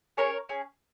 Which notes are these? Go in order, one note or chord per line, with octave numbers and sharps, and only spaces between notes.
C#4 G#4 A#4 C#5
C#4 G#4